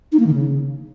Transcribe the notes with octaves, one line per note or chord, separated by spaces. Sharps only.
D#4
A#3
D#3
C#3